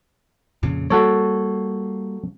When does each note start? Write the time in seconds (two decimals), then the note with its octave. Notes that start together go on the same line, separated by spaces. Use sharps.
0.63 F2 A#2 C#3
0.90 G3 A#3 F#4 A4 C#5